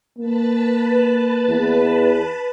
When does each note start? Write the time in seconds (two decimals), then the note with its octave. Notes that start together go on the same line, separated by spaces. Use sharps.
0.19 A#3 B4 A5 B5
1.49 E2